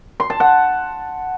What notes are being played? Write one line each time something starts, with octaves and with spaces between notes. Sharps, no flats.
C6
A5
F#5